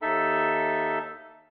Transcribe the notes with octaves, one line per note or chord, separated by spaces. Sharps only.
D#2 D#4 A4 E5 E6